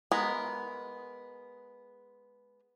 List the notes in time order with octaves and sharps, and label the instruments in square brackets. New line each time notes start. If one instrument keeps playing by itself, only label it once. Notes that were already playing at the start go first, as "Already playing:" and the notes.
[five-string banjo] G#3 B3 A#4